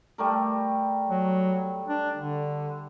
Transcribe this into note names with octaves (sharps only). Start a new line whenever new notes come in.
G3 A3 A#4
F#3
D4
D3